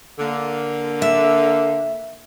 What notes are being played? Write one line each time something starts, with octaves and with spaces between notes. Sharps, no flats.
D3 A#3
E5